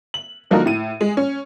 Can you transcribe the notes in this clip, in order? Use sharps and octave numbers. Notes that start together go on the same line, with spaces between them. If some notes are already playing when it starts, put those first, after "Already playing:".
F#7
D3 F3 A#3 D#4 F#4 A#4
A2 D#7
G#3
C#4